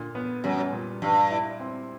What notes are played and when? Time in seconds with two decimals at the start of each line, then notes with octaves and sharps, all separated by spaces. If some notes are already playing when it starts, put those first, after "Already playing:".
Already playing: A#2 D3
0.15 B3
0.44 F#2 G3
0.73 A#2
1.02 G2 G3
1.31 E4
1.60 C4